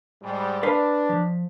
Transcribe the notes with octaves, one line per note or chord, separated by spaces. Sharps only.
G#2 G3
D4 B4 F5 C6
F3